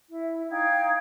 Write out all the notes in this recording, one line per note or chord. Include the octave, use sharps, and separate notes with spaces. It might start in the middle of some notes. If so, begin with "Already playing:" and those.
E4
D#4 F5 G5 G#6